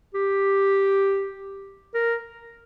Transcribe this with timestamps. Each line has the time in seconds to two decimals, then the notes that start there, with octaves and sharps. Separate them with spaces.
0.14 G4
1.94 A#4